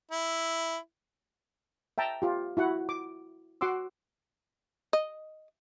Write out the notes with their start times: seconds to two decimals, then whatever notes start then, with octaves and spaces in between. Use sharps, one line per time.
0.11 E4
1.98 E5 G5 A5 A#5
2.22 F4 G4
2.57 E4 F#4 F#5
2.89 D6
3.61 F#4 F#5 C6 D6 E6
4.93 D#5